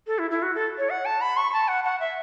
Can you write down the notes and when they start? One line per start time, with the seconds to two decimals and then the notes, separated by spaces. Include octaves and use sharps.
0.07 A4
0.19 E4
0.31 E4
0.42 F#4
0.55 A4
0.78 C#5
0.90 F#5
1.05 A5
1.21 B5
1.37 C#6
1.53 A5
1.68 F#5
1.84 F#5
2.00 E5